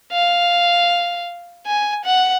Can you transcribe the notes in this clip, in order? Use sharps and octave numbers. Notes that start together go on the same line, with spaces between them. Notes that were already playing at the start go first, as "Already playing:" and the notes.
F5
G#5
F#5